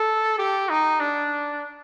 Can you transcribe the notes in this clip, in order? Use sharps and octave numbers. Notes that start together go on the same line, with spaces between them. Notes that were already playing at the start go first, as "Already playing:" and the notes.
Already playing: A4
G4
D#4
D4